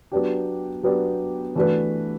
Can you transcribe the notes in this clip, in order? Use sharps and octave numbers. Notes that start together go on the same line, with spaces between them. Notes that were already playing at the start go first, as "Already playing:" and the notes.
F#3 B3 D4 G4
F#3 B3 D4 G4
E3 A3 D4 F#4 B4